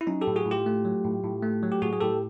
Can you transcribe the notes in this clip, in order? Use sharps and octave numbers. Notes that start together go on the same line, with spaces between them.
E4
F#3 C#4 D#4
G4 A4
A2
F#4 G#4
A2
F4 G4
A3
F#3
A2
A2
A3
F#3
G4
A2 F#4 G#4
G#4
A2 G4 A4